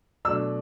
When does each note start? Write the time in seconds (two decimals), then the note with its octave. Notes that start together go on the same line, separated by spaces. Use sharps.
0.25 B2 F#3 A3 D4 E6